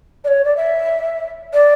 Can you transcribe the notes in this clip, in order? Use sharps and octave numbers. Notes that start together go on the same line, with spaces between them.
D5
C#5
D5
E5
D5